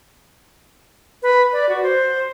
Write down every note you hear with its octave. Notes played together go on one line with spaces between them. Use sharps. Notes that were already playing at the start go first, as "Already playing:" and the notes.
B4
D5
F#4
C5